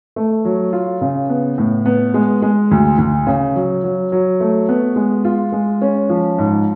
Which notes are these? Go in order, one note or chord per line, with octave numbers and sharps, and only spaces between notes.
A3
F#3
F4
C#3
B3
A2
B3
G#3
G#3
D2
D2
C#3
F#3
F#3
F#3
A3
B3
G#3
F4
G#3
C#4
F3
G#2